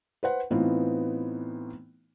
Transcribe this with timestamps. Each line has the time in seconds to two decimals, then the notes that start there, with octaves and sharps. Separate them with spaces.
0.23 B4 C5 F#5
0.50 A2 E3 B3 C4 D#4 F4